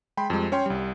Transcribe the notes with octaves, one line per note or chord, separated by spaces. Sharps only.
G#3 G5 B5 C6
F2 G3 G#3
C#4 C#5 G5 C6
C2 G3